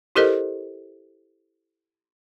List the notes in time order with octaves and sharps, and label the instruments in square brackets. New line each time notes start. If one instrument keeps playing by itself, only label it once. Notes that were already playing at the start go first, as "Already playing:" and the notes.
[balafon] E4 G4 A4 A#4 C5 D#5